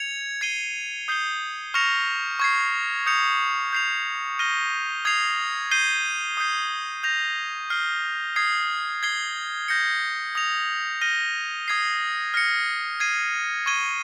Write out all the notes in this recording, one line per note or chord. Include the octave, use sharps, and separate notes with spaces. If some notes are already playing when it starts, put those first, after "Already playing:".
Already playing: G#6 C#7 F7
G#6 C7 D#7 G7
D#6 G6 C7 G7
C#6 F6 A#6 C#7 F7
C#6 G#6 C7
D#6 G6 C#7 F7
G6 C7 F7
F6 A#6 D#7 G7
D#6 G#6 C7 F7
G6 C7 D#7 G7
D#6 G6 C7
G6 A#6 F7
F6 C7 G7
D#6 G#6 C7
G#6 C7 G7
G6 A#6 C#7
D#6 A#6 F7
F6 A#6 D#7 G7
D#6 G#6 C7
F6 A#6 C#7
G#6 C7 D#7
C#6 G#6 D#7 G7